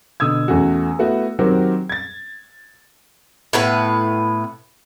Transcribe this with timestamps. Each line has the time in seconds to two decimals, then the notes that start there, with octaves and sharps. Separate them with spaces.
0.20 B2 D3 D#6 E6 G#6
0.48 E2 A3 C#4 F#4
0.99 A3 B3 E4 F#4
1.39 D#3 F#3 C4 F#4 G4 A#4
1.89 G#6 A6
3.53 A2 B3 B4